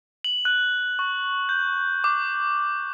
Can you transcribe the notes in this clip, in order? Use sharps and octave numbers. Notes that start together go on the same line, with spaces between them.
F#7
F#6
C#6
G6
D6